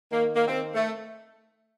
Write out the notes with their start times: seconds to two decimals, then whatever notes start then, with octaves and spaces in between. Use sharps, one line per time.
0.12 D#3 A#3
0.35 A#3
0.47 C4
0.75 A3